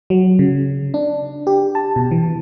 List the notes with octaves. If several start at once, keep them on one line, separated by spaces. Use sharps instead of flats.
F#3
C#3
D4
G4
A5
B2
E3